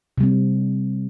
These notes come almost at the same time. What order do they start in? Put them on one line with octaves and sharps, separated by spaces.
C3 G3 C4